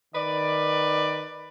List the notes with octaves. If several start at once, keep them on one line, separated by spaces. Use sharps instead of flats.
D#3 B4 D5